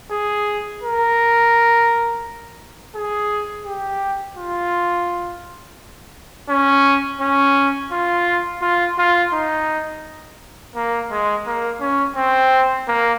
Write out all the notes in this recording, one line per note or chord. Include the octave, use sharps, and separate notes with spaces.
G#4
A#4
G#4
G4
F4
C#4
C#4
F4
F4
F4
D#4
A#3
G#3
A#3
C#4
C4
A#3